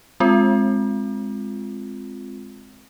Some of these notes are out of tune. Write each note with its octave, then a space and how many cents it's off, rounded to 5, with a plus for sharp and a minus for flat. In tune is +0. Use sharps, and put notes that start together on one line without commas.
G#3 +0 C4 +0 F4 +0